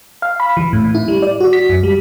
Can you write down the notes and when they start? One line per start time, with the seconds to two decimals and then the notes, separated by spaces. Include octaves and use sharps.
0.22 F5
0.40 B5
0.57 E3
0.73 A2
0.95 E4
1.08 G3
1.22 D5
1.40 F#4
1.53 B6
1.69 F#2
1.83 G3